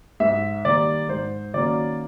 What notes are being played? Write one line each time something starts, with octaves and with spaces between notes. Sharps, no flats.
G#2 E5
D#3 G3 A#3 D5
G#2 C5
D#3 F#3 A#3 C#4 D5